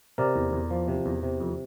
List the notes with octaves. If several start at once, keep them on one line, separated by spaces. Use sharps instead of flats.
C3 A#4 D5
E2
E2
F3
C3
E2
C3
F2